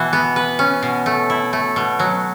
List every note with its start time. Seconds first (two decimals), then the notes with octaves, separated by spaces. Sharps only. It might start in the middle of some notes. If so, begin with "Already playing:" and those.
Already playing: B2 E3 F#4
0.13 B3
0.36 B4
0.59 C#4
0.83 B2
1.06 A3
1.30 E4
1.53 A3
1.76 B2
1.99 F#3